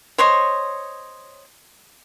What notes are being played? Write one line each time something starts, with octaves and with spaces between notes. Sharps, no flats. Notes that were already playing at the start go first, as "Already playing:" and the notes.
C5 C#5 D#5 C6